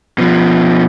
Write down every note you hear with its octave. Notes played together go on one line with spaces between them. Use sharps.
B2 F3